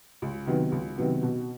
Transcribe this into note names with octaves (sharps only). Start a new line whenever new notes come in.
C#2
C3 D#3 F#3 B3
C#2
C3 D#3 F#3 B3
B2